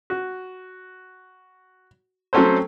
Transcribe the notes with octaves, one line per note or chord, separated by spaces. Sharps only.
F#4
F#3 A3 C4 C#4 A4 C5